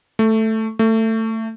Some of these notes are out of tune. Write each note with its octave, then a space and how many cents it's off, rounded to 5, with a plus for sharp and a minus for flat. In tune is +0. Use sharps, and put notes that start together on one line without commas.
A3 +5
A3 +20